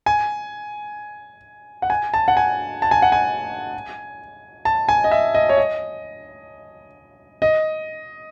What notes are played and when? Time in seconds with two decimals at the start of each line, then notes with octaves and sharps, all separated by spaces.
0.06 G#5
1.82 F#5
1.90 G#5
2.14 A5
2.28 F#5
2.37 G#5
2.82 A5
2.91 G#5
3.02 F#5
3.12 G#5
4.65 A5
4.89 G#5
5.04 D#5
5.11 E5
5.35 D#5
5.49 C#5
5.57 D#5
7.42 D#5